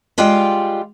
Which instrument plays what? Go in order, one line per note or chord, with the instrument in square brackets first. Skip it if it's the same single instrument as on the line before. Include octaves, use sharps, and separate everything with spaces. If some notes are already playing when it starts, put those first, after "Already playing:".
[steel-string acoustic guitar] G3 G#3 F4 D5 F5 G5